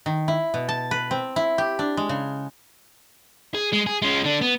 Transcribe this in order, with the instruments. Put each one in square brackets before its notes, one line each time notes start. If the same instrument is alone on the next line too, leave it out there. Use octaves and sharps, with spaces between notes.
[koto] D#3
E4
B2
A5
B4
C4
E4
G4
D4
G#3
C#3
[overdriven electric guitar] G#4
G#3
G#4
G#3 C#4
D3 D4
B3